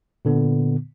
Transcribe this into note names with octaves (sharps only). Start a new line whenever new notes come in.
A#2 D3 B3